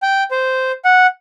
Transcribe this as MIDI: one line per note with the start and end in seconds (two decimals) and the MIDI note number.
0.03 0.24 79
0.31 0.72 72
0.85 1.07 78